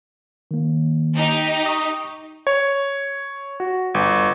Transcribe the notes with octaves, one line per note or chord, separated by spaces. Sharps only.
D#3 A#3
D#4 G4
C#6 D#6
C#5
F#4
G1